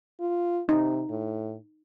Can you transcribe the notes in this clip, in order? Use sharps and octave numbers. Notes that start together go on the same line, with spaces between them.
F4
C3 D#4
A2